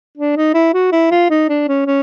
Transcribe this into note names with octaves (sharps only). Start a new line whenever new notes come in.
D4
D#4
E4
F#4
E4
F4
D#4
D4
C#4
C#4